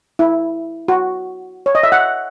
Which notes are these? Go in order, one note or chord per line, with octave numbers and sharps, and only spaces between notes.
E4
F#4
C#5
D#5
E5
F#5